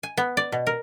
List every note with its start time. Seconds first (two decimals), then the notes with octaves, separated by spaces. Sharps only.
0.03 G#5
0.17 B3
0.37 D5
0.52 B2
0.67 A#4